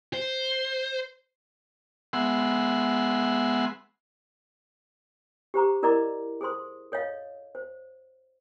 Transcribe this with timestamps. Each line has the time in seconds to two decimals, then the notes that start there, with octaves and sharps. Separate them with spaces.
0.14 C5
2.13 G#3 B3 E5 F#5 C6
5.54 G4 C5 A#5 D6
5.83 E4 A#4 D5 D#5 A#5 D6
6.41 G#4 A4 C5 C6 D#6
6.92 A4 C#5 D#5 F5
7.55 C5